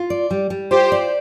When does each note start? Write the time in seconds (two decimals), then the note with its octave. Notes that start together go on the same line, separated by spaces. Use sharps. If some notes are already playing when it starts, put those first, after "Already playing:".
Already playing: F4
0.10 D5
0.31 G3
0.50 G3
0.71 F4 G4 C5
0.92 D5